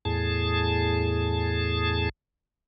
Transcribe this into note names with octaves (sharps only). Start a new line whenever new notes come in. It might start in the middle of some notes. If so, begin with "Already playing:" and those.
E2 A2 G#4 A5